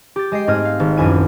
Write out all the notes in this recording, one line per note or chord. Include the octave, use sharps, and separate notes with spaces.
G4 A6
G#3 D#5 G5 C7
G#2 A3 C4 D#5 F6 G#6
F5
G#1
D#1 A#1 F#2 E4 G#5 D#7